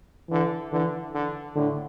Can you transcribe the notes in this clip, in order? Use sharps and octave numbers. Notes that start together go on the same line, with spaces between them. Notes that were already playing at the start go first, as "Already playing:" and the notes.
D3 E3
D3 E3
D3
A2 D3